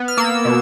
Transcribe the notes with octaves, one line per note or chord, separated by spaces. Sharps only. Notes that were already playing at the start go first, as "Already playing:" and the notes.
Already playing: B3
F6
A#3 E6
B2